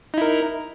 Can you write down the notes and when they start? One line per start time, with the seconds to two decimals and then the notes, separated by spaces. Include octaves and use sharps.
0.14 D#4
0.18 E4
0.22 A#4